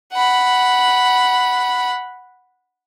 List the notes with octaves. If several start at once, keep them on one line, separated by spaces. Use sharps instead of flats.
F#5 B5